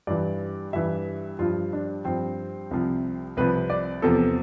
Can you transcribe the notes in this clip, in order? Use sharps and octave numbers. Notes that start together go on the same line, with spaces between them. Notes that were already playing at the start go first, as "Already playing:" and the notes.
G2 E3 D5
G2 E3 E5
G2 F3 F4
D4
G2 F3 C4
C2 C3 F3
C2 C3 F3 B4
D5
E2 C3 F3 A4